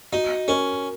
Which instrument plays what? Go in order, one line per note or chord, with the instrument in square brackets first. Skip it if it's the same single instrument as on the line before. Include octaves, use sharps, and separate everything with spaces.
[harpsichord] D#4 [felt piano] F#4
[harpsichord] C#4 [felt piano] A#4